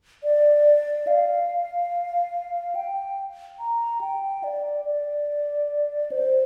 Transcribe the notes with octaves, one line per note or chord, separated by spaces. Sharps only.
D5
F5
G5
A#5
G5
D5
D5
C5